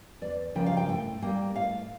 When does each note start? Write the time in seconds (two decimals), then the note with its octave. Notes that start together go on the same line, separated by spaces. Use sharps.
0.21 E2 D5
0.55 C#3 F3 A#3 G5
0.66 F5
0.77 G5
0.89 A2 G5
1.22 G3 A#3 G5
1.55 A2 F5